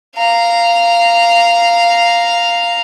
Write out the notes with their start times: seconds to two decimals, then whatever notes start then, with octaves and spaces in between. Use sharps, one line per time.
0.15 F5 A#5